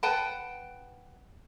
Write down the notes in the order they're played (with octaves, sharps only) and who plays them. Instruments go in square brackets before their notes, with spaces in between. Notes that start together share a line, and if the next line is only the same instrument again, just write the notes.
[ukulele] B4 F#5 G5 A5